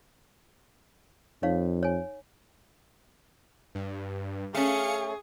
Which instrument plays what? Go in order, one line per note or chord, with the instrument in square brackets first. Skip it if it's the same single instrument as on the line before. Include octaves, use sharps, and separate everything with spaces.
[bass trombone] F2 [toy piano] D#4 C#5 F5
[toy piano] C#5 G#5
[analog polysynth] G2
[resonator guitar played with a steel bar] A3 C#4 [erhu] G#4 [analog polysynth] F5 C#7